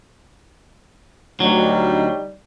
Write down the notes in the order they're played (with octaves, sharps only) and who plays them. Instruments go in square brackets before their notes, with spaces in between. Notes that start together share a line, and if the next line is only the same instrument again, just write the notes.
[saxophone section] D2 [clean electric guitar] F#3 [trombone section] G3 D#4